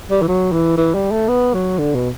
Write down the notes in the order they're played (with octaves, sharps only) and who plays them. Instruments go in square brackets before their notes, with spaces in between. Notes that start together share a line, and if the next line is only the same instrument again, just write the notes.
[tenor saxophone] G3
E3
F#3
E3
E3
G3
A3
B3
F#3
D3
B2